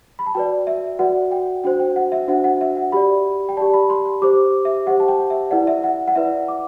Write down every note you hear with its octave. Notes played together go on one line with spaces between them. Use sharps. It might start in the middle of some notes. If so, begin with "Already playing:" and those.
B5
A5
F#4 B4 D5 G5
E5
F#4 B4 D5 F#5
G5
D4 F#4 C5 G5
G5
F#5
E5
D4 F#4 C5 F#5
F#5
E5
F#5
G4 D5 B5
G5
G4 D5 A5
B5
C6
C6
G4 C5 D6
E5
G4 C5 F#5
A5
G5
E5
E4 B4 D5 F#5
E5
F#5
F#5
E4 B4 D5 E5
D6